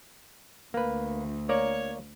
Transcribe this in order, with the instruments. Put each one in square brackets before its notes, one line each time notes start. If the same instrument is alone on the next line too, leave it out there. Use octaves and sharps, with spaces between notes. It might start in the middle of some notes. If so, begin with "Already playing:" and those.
[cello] D2 [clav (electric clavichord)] A#3 B4
[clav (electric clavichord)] A#3 D5 A#5 [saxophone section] C#5